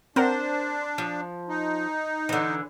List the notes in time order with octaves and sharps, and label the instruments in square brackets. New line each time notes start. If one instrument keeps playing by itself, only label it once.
[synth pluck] C4 A#4 F#5 [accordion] D4 [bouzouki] C5
[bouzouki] F3
[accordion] D#4
[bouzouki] D3 E3